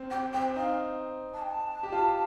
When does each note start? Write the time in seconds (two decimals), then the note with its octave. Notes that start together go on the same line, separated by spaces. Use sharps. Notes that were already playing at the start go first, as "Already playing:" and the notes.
Already playing: C4
0.10 C4 G5
0.33 C4 G5
0.56 D#4 F5
1.34 A5
1.42 G5
1.50 A5
1.83 G4
1.92 F4